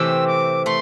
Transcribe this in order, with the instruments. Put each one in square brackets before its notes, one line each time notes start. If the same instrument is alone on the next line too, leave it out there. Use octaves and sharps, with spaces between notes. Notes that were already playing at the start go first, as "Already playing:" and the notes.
Already playing: [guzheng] C3 E3 A3 C4 G4 [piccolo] E6
[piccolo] D6
[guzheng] A3 [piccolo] C6